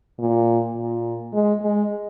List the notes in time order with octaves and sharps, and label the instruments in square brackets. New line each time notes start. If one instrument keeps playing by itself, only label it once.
[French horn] A#2
A#2
G#3
G#3